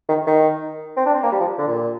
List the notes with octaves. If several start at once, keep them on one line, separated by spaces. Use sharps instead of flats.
D#3
D#3
C4
D4
C4
A#3
G3
F3
D3
A#2